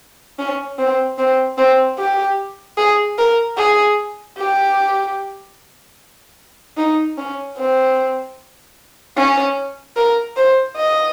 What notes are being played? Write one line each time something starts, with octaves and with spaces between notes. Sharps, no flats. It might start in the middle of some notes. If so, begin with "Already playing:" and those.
C#4
C4
C4
C4
G4
G#4
A#4
G#4
G4
D#4
C#4
C4
C#4
A#4
C5
D#5